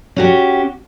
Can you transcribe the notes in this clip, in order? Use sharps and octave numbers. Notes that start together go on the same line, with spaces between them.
C#4 F#4 G4